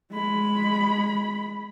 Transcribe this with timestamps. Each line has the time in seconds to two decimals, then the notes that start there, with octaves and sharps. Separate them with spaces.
0.11 G#3 B5